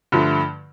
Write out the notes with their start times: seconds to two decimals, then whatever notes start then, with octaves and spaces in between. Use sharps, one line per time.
0.12 G2 D3 F3 A3